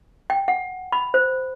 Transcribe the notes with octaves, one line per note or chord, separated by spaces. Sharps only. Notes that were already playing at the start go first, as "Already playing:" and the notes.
G5
F#5
B5
C5